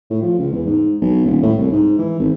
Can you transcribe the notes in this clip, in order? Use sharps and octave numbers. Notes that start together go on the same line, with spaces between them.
A2
F3
C#2
E2
G#2
B1
D#1
A2
C2
G#2
E3
G#1